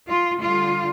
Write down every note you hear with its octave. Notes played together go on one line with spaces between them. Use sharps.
F4
D3 G3 F4